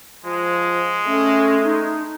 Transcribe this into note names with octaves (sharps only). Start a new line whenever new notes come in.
F3 G#3
A3 C#4
D#4